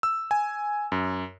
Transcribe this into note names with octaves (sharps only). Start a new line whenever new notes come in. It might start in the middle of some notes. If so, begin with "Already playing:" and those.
E6
G#5
F#2